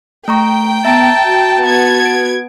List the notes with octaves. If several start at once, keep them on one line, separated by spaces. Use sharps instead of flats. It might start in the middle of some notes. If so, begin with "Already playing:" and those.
A3 G5 A#5 C#6
B3 E5 A5 A#5 D7
F#4
B3 G#6
D7